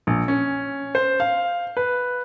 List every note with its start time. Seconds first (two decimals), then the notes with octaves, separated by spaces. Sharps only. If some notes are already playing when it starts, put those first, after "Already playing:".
0.07 A#1
0.28 C#4
0.95 C5
1.20 F5
1.77 B4